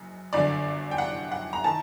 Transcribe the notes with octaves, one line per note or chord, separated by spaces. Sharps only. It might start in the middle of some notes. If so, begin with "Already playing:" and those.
Already playing: F#1 F#2
G1 F#2 D3 D5
G5
F#5
F#5
A#5
D#3 A5